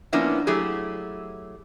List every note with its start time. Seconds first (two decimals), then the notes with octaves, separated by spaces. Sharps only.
0.13 F3 A#3 B3 C#4 D4 E4
0.47 F#3 A3 E4 G4 G#4